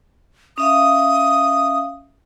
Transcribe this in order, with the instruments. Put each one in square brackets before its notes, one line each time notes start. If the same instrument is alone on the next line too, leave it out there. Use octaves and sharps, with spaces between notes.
[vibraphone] C#4 E5 F5 [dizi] D#6